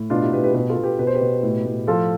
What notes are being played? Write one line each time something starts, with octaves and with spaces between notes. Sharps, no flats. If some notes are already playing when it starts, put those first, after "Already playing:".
Already playing: A2
B2 D4 F4
E4 G4
B2 G4 B4
G4 B4
B2 G4 B4
F4 A4
B2
G4 B4
B2 B4
C5
G4 B4
B2
A2
A2
F3 F4 A4